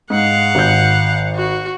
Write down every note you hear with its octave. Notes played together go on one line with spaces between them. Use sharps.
G#2 F5 F#5
G#1 G6
F#4